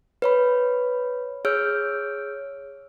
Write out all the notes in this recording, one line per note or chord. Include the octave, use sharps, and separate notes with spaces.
B4 C#5 B5
G#4 C#5 E6 F6 G6 D7